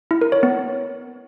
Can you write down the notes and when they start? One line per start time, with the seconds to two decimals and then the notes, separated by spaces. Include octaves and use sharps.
0.11 E4
0.21 A#4
0.32 C#5
0.43 B3